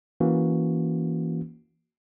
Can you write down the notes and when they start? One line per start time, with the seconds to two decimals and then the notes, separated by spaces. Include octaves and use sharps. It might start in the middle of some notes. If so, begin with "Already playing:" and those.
0.20 E3 A#3 C#4 F#4